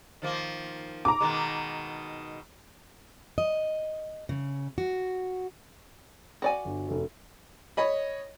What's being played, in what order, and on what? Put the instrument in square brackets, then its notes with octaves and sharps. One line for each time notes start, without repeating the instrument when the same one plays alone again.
[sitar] D#3 F3 A#3
[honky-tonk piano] A#5 D6
[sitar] B2 D#3 G#3
[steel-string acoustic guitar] D#5
C#3
F#4
[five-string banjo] F#4 D5 G#5
[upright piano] G1
F1 A4
[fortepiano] C#5 D#5 B5